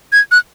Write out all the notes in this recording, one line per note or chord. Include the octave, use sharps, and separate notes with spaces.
G#6
F#6